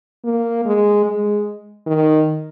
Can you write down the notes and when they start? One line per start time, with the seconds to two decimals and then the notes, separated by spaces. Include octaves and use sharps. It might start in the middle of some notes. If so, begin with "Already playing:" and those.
0.24 A#3
0.65 G#3
1.06 G#3
1.87 D#3